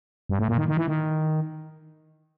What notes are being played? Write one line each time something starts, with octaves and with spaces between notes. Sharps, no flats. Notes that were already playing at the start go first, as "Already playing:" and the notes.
G2
A2
A#2
D#3
D#3
E3
D#3